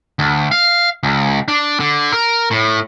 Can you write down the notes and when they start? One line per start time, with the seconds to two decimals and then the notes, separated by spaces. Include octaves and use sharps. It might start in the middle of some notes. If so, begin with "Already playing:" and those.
0.19 D2
0.51 F5
1.03 C#2
1.48 D4
1.80 D3
2.12 A#4
2.51 A2